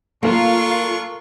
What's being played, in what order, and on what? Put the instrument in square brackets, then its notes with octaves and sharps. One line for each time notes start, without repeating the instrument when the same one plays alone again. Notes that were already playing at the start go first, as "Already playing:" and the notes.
[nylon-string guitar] A#3 [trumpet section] D4 C6 C#6 [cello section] F4 [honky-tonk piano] A4 A#4